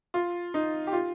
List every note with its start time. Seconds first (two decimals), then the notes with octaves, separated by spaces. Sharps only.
0.14 F4
0.54 D#4
0.87 G4
0.93 F4